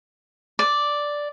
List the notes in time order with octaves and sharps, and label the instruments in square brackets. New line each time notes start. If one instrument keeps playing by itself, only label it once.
[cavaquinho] D5